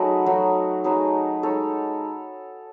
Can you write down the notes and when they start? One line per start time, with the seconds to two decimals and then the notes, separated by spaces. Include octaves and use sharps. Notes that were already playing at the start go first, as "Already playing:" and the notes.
Already playing: F#3 A3 D#4 F#4 G#4 B4
0.26 F#3 A3 D#4
0.84 F#3 A3 D#4 G#4 B4
1.43 G#3 D#4 A4 C#5